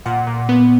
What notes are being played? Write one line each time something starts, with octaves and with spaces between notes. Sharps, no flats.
A#2 F#5
A#2
B3